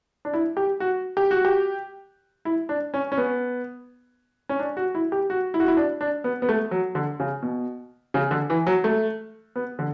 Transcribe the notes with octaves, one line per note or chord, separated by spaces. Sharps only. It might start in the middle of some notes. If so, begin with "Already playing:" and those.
D4
E4
G4
F#4
G4
F#4
G4
E4
D4
C#4
C#4
B3
C#4
D4
F#4
E4
G4
F#4
E4
F#4
E4
D4
D4
B3
B3
A3
F#3
D3
C#3
B2
C#3
D3
E3
F#3
A3
B3
D3